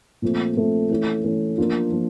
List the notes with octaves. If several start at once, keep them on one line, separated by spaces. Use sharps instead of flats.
A#2 F3 A3 C4
A#2 F3 A3 C4
E3 A3 C#4
E3 A3 C#4
F3 A#3 D4 F4
F3 A#3